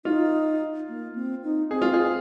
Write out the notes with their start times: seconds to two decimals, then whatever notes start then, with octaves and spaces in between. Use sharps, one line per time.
0.05 D#4 F4
0.89 A#3
1.16 C4
1.43 D#4
1.71 C4 G#4
1.82 F4
1.94 G#4